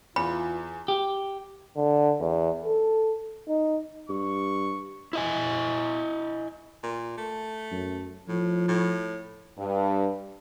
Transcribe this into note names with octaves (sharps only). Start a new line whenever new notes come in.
E2 B3 E4 F4 B5
G4
D3
E2
A4
D#4
G2 C#6
E4 D#5 G#5
A#2
A3
F#2
A2 F3
A2
G2